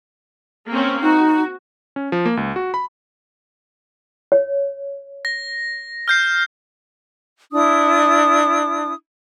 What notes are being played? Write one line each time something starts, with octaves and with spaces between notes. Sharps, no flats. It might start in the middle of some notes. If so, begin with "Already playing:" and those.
A#3 C4 C#4
D#4 F#4
C#4
F3
A#3
C#2
F#4
B5
C#5
A#6
F6 G6 C7
D4 E4 D#6